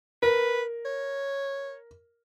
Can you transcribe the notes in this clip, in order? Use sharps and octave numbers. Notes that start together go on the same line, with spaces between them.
A#4 B4
C#5